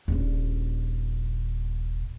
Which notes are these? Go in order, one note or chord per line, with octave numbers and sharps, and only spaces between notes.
D#1 A#1